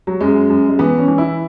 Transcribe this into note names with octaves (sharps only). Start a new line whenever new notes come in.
F#3
F#2 G#3
F#2
G#3
E3 B3
C#4
E3
E4